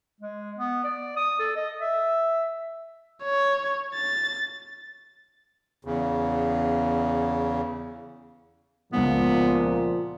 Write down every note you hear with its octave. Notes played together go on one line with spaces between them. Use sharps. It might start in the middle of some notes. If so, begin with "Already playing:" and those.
G#3
B3
D5
D#6
A4
D#5
E5
C#5
A6
E2 C#3
C#2 A#2 F3 G#3 B3 F4